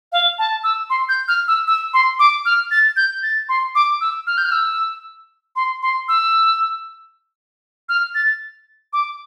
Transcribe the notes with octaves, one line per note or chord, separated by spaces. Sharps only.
F5
A5
E6
C6
G6
F6
E6
E6
C6
D6
F6
A6
G6
A6
C6
D6
E6
F6
G6
F6
E6
C6
C6
E6
F6
A6
D6